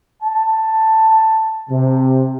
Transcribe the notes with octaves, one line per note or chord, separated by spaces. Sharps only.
A5
C3